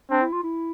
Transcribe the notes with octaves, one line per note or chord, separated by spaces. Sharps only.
C4 D4
E4
F4
E4